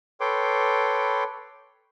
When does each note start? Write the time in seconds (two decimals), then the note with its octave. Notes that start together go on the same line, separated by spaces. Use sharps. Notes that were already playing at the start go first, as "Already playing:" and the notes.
0.21 A4 B4 C#5 G5 C6 D6